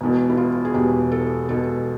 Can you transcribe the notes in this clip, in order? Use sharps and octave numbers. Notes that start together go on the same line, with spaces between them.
E1 E2 B2
E4
F4
G#4
E1 E2 B2 G4
A4
E1 E2 B2 A4